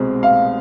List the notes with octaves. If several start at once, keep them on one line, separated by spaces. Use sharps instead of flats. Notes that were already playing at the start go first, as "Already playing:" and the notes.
Already playing: C2 B2 G#3 C4
F5